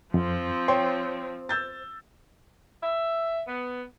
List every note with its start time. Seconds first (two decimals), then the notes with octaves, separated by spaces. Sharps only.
0.14 F2 F3 C4
0.68 C5 C#5 G5 C6
1.49 E6 G6 A6
2.81 E5
3.47 B3